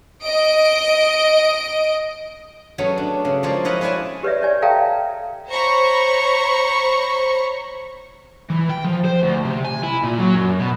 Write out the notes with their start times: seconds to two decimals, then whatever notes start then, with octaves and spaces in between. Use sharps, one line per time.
0.24 D#5 D7
2.78 F#3 A3 B3 C#4 G#4 C#5
2.98 D4
3.25 C#3
3.43 F3 G#3 A#3 C#5 D5
3.65 E4 B4 C#5 D#5 F5 F#5
3.81 G#4 B4 C#5 D5 G#5 A5
4.23 G4 B4 C#5 D5 E5
4.42 C#5 D5 G#5
4.62 A4 E5 F5 G5 A5 A#5
5.49 C5 C#5 A#5 B5 C#6
8.50 E3
8.69 G5
8.84 F3
9.05 C5
9.22 D2
9.45 C3
9.65 G#5
9.83 E4
10.03 A#2
10.19 F#3
10.35 F#2
10.60 B2